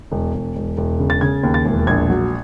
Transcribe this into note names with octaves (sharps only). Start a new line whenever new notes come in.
E1
E1
E1
E1
C#3
A6
C#3 G#6
D#2
A6
E1
A#1 G#6
F#3